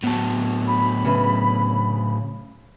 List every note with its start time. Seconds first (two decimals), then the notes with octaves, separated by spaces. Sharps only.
0.04 A2 F#3 B3 A5
0.67 B5
1.05 C#3 B4 E5